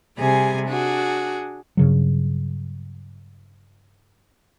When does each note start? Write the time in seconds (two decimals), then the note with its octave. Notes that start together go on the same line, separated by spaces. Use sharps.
0.18 C3 G3 G#4 G#5
0.68 D4 F#4 G#4
1.77 G2 C#3 F#3